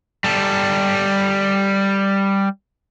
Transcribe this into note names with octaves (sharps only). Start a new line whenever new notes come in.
G3 A4